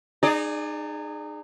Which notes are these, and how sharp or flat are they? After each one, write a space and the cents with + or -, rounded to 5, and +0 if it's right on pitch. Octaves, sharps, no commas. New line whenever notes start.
D#4 -30 G#4 +0 D5 +15